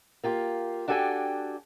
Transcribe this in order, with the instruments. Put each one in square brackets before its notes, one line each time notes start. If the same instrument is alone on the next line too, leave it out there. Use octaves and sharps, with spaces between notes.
[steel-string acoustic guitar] A#3 F4 G4
D4 F#4 G4 A4 G5 G#5